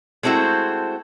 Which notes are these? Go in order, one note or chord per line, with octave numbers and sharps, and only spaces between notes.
G#3 A3 C4 E4 F#4